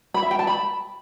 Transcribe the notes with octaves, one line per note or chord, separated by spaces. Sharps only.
B5
E5
G5
A5
B5